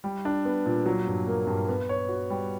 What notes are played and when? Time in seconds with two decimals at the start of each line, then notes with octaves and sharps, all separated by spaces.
0.04 G3
0.25 D4
0.45 B3
0.66 A#2
0.86 F#3
1.07 G2
1.27 A#3
1.47 G2
1.68 B3
1.89 C#5
2.09 F#4
2.30 G3